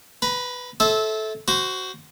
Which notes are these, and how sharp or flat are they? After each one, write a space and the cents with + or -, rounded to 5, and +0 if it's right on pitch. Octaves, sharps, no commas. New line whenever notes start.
B4 +10 A#5 +40
A4 -15 C5 +20 E5 -20
F#4 +15 C5 -5